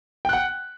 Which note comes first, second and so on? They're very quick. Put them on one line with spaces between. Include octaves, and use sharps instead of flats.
G5 F#6 F#5